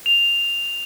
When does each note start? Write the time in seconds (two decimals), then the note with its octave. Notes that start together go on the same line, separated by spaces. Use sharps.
0.06 F7